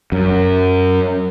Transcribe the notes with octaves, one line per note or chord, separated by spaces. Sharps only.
F#2